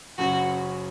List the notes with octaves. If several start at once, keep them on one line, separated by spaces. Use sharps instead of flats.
F#1 F#2 C#3 F#3 C#4 F#4